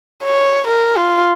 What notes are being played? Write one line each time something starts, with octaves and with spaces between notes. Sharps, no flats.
C#5
A#4
F4